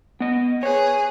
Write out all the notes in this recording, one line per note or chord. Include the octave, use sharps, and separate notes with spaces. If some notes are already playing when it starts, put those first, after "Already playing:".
B3 D#5
G#4 B4 C#5